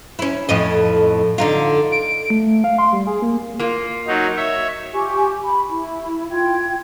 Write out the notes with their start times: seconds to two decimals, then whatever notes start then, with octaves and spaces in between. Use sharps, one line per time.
0.19 C#4 E4
0.49 F2 A2 D#5
1.38 D3 D#4 F4
1.92 D7
2.30 A3
2.64 F5
2.78 C6
2.93 G3
3.07 G#4
3.22 A#3
3.59 A#3 F4
4.07 F#3 D#4
4.37 C#5 E5
4.93 F4 G4 G#5 C#6
5.44 B5
5.69 E4
6.31 F4 G5 G#6